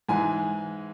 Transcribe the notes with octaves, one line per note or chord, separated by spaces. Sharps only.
G#2 E3 G#3 G#5